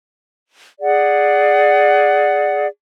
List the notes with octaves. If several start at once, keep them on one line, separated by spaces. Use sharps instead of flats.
G#4 D5 F#5